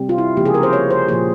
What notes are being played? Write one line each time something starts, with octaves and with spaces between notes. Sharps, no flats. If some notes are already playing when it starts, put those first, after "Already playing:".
Already playing: C3 G3 C4
F4
E4
C#3 F3 A#3 G4
G#4
A#4
C5
C#5
C5
A#2 F3 A#3 G#4